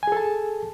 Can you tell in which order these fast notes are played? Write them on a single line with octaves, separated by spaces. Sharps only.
G#5 G#4 A4 A5